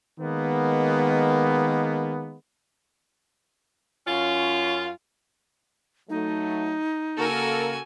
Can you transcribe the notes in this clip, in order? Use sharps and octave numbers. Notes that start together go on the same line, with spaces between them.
D#3 G#3 A#3 B3
F#2 C#4 F4
F#3 A3 D#4
C#3 A#3 F#4 A4 A#4 G#5